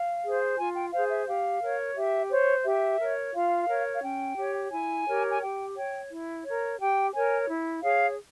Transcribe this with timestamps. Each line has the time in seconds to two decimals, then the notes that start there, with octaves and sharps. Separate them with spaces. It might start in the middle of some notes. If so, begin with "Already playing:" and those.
Already playing: F5
0.23 G#4 C5
0.57 F4 G#5
0.75 G5
0.92 G#4 C5 F5
1.09 E5
1.26 G4 F5
1.62 A#4 C#5
1.96 G4 E5
2.30 C5 C#5
2.65 G4 E5
3.00 A#4 C#5
3.34 F4 F5
3.68 A#4 C#5
3.95 F5
4.03 C#4 G5
4.37 G4 C#5
4.72 E4 G#5
5.07 G4 A#4 C#5
5.30 G#5
5.41 G4 G5
5.76 C#5 G5
6.10 E4
6.45 A#4 C#5
6.79 G4 G5
7.14 A#4 C#5 G#5
7.48 E4
7.83 G#4 C#5 F5